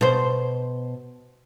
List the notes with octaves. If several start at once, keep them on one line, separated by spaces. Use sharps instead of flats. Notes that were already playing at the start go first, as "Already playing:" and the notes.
B2 C5